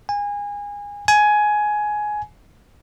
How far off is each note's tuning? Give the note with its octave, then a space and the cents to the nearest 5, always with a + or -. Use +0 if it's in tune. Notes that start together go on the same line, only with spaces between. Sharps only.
G#5 -25
G#5 +15